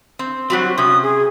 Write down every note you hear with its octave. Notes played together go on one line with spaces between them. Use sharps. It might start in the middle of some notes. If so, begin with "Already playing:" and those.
C4
F#3 G3 C4 F#4
C3 C#4 D#6
G#4